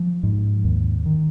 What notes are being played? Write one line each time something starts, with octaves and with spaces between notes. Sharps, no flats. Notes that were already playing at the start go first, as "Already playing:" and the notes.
Already playing: F3
G#2
D#2
D#3